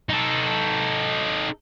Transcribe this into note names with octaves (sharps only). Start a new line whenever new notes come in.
D#4 A4